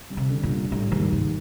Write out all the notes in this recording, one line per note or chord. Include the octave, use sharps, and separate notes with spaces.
G3
C3
D3
A#2
G3
A2 G3
D#2 G#2
D#2 G#2